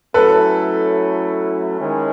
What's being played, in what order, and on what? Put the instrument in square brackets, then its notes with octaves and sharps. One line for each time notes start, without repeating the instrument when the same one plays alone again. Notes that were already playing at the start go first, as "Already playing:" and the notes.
[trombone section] F#3 A3 C#4 E4 [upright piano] A4 B4
[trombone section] D#3 G#3 C#4 E4